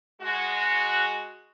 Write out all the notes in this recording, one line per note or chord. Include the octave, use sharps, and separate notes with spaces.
G#3 F#4